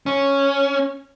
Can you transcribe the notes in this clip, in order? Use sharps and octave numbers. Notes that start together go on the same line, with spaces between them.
C#4